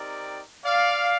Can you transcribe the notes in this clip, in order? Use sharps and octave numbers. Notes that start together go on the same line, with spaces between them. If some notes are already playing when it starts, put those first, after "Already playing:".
Already playing: C4 D#4 G4 A#4 D5
D5 F5